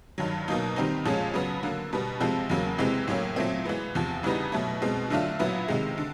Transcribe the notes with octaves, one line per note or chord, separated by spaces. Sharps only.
G2 D#3 F#3
B2 F#3 A#3 D#4
D#3 G3 C4 D#4
A#2 F3 G#3 C#4
C#3 F#3 B3
D3 F#3 A#3
B2 G3 B3
C3 F3 G#3 C4
E2 C#3 F#3 A#3
C3 E3 G#3 C4
A2 F#3 A#3 C#4
A#2 F#3 A3 C4
E3 G#3 B3
E2 C3 F3
C#3 E3 G3 B3 D#4
B2 F#3 A3
B2 G#3 C4
D3 F#3 A3 D4 F4
A#2 F#3 B3 E4
C3 D#3 G#3
D3